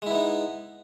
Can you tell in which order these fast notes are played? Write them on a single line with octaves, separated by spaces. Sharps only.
G#3 E4 B3 D#4